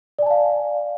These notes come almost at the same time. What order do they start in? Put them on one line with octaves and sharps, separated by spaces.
D5 G#5 A5 F5